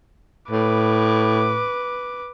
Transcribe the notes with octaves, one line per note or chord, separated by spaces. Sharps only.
A2 B4 D6